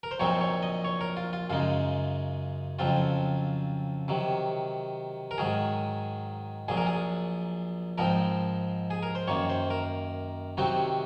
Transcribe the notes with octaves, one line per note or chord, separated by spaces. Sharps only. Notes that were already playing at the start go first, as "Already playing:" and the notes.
A#4
C5
A#1 A#2 F#3 C4 D#4 C#5
C#5
D#5
C#5
A#4
F4
F4
F#2 C#3 G#3 D#4 F4
F2 C#3 F#3 C4 F4
C3 D#3 F#3
A#4
G#2 D#3 F#3 G#4
A#1 A#2 F#3 G#4
A#4
G#4
G#2 F3 C4 D#4 A#4
G#4
A#4
C5
F#2 D#3 A#3 C#5
C5
A#4
C3 D#3 F#3 C4 D#4 F#4